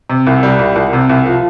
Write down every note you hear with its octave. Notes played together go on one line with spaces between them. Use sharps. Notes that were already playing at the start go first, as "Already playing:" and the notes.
C3
C2
G3
C2
C2
C3
C2
F3